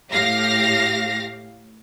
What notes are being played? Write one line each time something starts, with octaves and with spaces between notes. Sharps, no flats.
A2 G4 F5 A#6